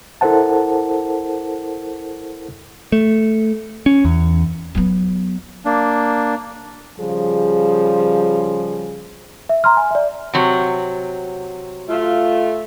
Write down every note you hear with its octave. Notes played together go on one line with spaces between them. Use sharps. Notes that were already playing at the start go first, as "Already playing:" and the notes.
E4 A4 A#4 C5 F#5 A5
A3
C#4
E2
F#3 B3
A#3 D4
C#3 F3 G3 G#4
E5
A#5 C6 F6
G#5
D5 E5
C3 F#3
A3 F4